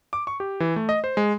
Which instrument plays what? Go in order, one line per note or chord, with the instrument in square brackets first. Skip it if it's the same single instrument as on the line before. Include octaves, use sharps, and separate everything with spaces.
[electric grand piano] D6
C#6
G4
E3
A3
D#5
C5
G#3